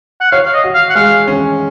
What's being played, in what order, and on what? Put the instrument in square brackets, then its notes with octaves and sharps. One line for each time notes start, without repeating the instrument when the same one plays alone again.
[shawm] F#5
[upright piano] C#5 [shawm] F5
[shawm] F5
D#5
[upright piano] F#4
[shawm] F5
F#5
[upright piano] G#3 [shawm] F5
[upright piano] C#4